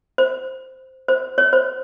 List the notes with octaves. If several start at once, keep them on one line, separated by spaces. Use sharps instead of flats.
C5
C5
C#5
C5